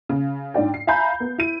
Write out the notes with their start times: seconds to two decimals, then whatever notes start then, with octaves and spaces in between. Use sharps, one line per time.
0.09 C#3
0.54 G#2 D4 D5 G5
0.74 C7
0.87 E5 F5 G#5 A#5 B5 G6
1.20 B3
1.38 E4 D#7